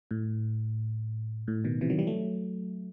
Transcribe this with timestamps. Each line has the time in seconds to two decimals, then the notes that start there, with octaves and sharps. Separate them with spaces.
0.11 A2
1.48 A2
1.64 B2 D#3
1.81 C3 E3
1.90 D#3 F#3
1.98 E3 G3
2.07 F#3 A3